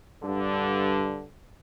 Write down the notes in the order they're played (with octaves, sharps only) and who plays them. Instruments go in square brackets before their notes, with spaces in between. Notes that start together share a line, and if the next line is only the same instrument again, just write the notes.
[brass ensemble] G2 D3